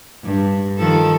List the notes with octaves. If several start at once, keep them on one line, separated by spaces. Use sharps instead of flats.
G2
D#3 F3 A4